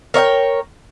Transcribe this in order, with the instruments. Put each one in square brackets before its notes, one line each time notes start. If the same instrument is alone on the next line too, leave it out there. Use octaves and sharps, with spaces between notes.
[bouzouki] A#4 C#5 E5 G5